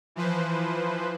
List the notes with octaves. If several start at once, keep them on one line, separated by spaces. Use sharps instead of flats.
E3 F3 B4 C5